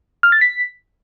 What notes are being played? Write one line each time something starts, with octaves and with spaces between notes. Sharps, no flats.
F6
A6
B6